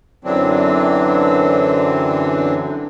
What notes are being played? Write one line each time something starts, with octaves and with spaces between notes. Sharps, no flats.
F#2 D3 E3 F#3 C4 D4